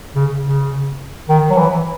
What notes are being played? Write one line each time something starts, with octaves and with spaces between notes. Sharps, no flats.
C#3
C#3
D#3
F#3
E3